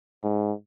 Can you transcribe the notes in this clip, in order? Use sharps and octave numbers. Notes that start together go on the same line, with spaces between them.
G#2